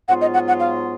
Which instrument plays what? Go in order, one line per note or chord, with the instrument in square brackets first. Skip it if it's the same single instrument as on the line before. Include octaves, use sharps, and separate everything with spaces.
[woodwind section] G#2 F#3 B3 F4 [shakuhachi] F#5
[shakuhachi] D#5
F#5
F#5
F5